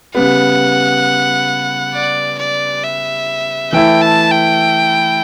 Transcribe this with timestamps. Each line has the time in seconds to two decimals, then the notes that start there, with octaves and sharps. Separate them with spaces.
0.15 C#3 G3 B3 F#5
1.94 D5
2.39 D5
2.84 E5
3.72 E3 A3 E4 G5
4.01 A5
4.32 G5